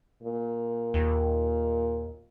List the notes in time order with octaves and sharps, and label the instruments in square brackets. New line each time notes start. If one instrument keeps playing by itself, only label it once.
[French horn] A#2
[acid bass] D#2